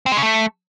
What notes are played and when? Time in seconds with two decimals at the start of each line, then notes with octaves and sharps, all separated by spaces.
0.06 C4
0.12 G#3
0.17 C#3
0.23 A3